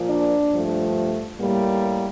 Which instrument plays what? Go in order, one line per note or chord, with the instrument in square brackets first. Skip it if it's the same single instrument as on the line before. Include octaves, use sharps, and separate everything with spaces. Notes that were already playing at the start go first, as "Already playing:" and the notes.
Already playing: [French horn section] A#2 F3 A#3
D4
G2 F3 A3
A2 G3 A#3